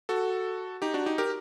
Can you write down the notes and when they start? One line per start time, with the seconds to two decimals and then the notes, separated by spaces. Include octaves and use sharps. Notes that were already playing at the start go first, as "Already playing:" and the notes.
0.09 F#4 A4
0.82 D#4 G4
0.94 D4 F#4
1.06 D#4 G4
1.18 G4 A#4